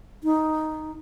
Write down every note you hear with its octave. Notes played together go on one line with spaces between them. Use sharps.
D#4